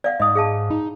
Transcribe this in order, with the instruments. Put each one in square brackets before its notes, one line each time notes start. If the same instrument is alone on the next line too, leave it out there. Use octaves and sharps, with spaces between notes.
[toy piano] D5 F5 F#5
[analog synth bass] G#2 [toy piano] D#5 D#6
[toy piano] G#4 F5 A5
[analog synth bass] D#4 [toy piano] B5